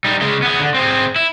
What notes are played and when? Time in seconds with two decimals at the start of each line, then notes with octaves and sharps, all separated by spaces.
0.05 G3 D#4
0.21 C#3 G#3
0.42 B3 G#4
0.59 D3
0.74 C4 G#4
1.16 E4